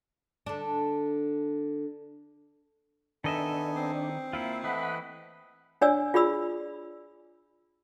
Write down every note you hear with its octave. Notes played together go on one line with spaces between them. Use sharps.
D3 D4
D#3 B3 D4 A4 D#5 E5 G#5
C4
A#3 E4 F4 E5
E3 A3 B4 D#5 F#5 B5
D4 C#5 D5 G#5 E6
F4 G#4 D5 B5 E6